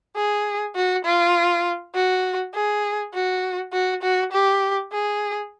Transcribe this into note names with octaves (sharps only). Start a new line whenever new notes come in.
G#4
F#4
F4
F#4
G#4
F#4
F#4
F#4
G4
G#4